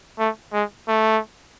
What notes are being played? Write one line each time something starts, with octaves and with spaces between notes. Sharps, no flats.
A3
G#3
A3